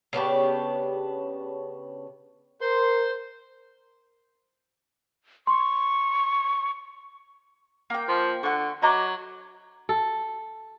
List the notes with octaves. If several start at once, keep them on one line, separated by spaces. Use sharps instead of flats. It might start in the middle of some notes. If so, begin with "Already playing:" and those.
C#3 B3 D4 G4
A#4 C5 C6
C6 C#6
A#3 G5
F3
D3 F#5 C#6
F#3 D#5 A#5 D6
A4